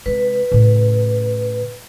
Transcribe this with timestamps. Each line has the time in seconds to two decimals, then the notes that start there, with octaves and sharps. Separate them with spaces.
0.06 C3 G#3 B4
0.52 A2 C#3